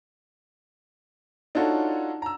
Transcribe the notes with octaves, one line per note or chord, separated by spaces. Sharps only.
D4 D#4 F4 F#4 A4 C#5
A#5 E6